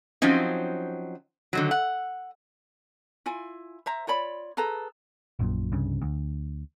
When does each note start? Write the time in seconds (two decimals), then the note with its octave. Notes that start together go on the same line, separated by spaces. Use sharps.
0.22 F3 F#3 C4 C#4 D#4
1.53 D3 D#3 F#3
1.71 F#5
3.26 E4 F4 G#5
3.86 C5 E5 A#5
4.07 F4 C#5 D5 B5
4.57 G#4 A4 B4 A#5
5.39 A#1 F#2 A#2
5.72 C2 G2 C#3
6.02 D2